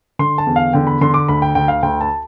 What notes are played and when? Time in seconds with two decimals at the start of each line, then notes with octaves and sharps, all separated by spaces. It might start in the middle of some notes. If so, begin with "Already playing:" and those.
0.19 D3 C6
0.38 A5
0.47 E2
0.56 F5
0.73 D3 G5
0.87 B5
1.01 D3 C6
1.14 D6
1.28 D2 B5
1.42 G5
1.55 D2 G5
1.68 F5
1.83 D2 G5
2.01 A5